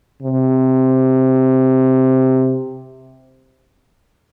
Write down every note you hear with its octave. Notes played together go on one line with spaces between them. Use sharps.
C3